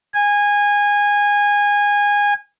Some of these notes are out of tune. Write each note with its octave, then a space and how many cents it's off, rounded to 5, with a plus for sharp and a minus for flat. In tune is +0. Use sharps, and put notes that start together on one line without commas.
G#5 -20